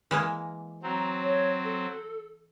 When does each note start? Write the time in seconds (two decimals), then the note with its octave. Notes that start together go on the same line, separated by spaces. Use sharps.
0.11 E3 G#3 A#3
0.83 F#3 C4 A#5
1.23 C#5
1.64 A4